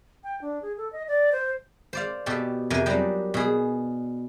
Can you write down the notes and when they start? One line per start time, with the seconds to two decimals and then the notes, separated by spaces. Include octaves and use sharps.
0.24 G5
0.41 D4
0.62 G#4
0.78 A4
0.93 D#5
1.08 D5
1.32 C5
1.93 C5 D5 F5
2.26 B2 G4 A4
2.70 F2 C3 A#4 G#5
2.86 F#3 G3 D4 D#4 G4
3.34 B2 G#4